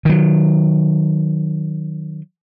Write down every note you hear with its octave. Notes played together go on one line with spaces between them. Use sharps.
D#3 F#3